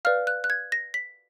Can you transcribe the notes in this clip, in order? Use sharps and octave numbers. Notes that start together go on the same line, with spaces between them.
B4 D5 F5 F6
F#6
F#6
G#6
A#6
B6